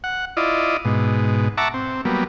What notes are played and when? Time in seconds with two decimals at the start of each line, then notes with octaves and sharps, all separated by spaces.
0.04 F#5
0.37 E4 F4 D5 D#5
0.85 G#2 B2
1.57 E5 F#5 A5 A#5 C#6 D6
1.74 C4
2.05 F#3 G3 A#3 B3